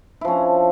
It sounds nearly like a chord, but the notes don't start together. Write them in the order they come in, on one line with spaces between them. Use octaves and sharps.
E4 F3 C#4 D4